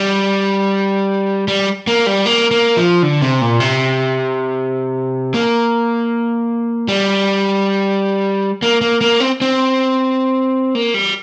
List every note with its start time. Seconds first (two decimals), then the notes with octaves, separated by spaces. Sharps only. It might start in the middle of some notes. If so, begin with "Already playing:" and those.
Already playing: G3
1.48 G3
1.87 A#3
2.07 G3
2.26 A#3
2.51 A#3
2.77 F3
3.02 D3
3.22 C3
3.42 A#2
3.60 C3
5.34 A#3
6.88 G3
8.62 A#3
8.81 A#3
9.01 A#3
9.20 C4
9.41 C4
10.75 A#3
10.94 G3